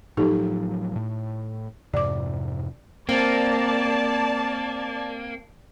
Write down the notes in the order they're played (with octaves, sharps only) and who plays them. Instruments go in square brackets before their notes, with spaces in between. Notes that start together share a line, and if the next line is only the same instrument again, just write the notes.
[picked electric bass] A2 F3 F#3 [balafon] D#4 G4 A4
[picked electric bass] A2
[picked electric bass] F2 G#2 C3 [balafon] D5 D6
[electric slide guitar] A#3 [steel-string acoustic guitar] C4 [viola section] D5 A5